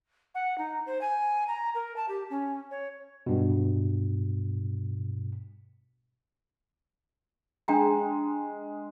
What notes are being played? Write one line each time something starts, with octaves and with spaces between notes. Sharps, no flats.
F#5
D#4
C5
G#5
A#5
A#4
A5
G4
C#4
C#5
G2 B2
G#3 D4 G5 A#5